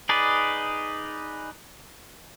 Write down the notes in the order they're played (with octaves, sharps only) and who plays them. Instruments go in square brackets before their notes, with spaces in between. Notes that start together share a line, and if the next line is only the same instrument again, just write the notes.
[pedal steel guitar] D#4 G#4 B4 D5